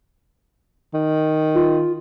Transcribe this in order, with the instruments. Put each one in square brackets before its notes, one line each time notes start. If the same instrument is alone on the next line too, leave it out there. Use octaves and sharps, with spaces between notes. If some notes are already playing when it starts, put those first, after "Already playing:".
[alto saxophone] D#3
[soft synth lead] F4